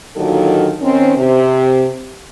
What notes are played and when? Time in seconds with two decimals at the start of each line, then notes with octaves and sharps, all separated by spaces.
0.16 D#2 A#2 D3 D#3 F#3 A4
0.82 D#3 C4 C#4
1.17 C3